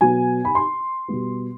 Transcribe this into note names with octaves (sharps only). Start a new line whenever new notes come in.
B2 F#3 B3 G#5
B5
C6
B2 G3 B3